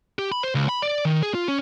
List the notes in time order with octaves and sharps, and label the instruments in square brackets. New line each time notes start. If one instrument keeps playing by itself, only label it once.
[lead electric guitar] G4
B5
C5
C#2
B5
D5
D#3
G#4
F4
C#4